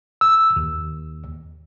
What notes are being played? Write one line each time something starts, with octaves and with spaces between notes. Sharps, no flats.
E6
D#2